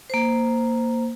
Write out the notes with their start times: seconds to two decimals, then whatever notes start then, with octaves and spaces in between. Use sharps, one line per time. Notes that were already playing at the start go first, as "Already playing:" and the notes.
0.10 A#3 C5